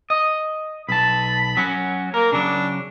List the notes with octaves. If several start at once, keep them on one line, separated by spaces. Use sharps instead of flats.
D#5
B1 A5 B5
F#3 C#4 F#4
A#3 A#4
C#3 F#3 D4